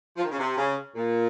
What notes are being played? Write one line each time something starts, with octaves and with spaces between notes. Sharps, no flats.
F3
D#3
C#3
C3
C#3
A#2